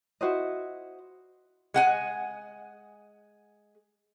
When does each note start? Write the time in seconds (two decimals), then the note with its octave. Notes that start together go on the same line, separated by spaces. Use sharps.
0.21 E4 F#4 C5 D#5
1.74 G#3 F#5 G#5